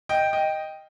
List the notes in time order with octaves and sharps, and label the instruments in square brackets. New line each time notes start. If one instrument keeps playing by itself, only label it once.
[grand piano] D#5 G5
D#5 G5